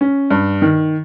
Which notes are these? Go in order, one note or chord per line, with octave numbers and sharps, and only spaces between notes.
C#4
G2
D#3